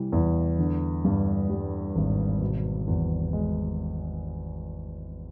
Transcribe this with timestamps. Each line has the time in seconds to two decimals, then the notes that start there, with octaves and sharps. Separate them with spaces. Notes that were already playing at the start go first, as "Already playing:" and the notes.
Already playing: C3 E3 G3
0.12 E2
0.59 D3
1.05 G2
1.50 G3
1.96 G#1
2.41 B2
2.87 E2
3.33 G#3